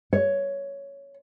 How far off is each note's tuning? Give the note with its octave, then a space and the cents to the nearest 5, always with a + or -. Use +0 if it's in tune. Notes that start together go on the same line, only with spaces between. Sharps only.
C#5 +5